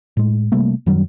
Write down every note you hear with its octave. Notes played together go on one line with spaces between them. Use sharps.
A2 G#3
C3 G3 A3 A#3
F#2 D#3 F#3 G3